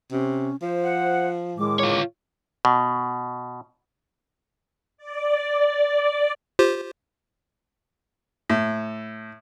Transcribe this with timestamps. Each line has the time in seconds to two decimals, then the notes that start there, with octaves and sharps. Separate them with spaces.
0.12 C3 C#4
0.62 F3 C5
0.84 F#5
1.57 A2 D#3 G#3 D6
1.79 F4 C#5
2.65 B2
4.98 D5
6.59 F4 G4 C5
8.50 A2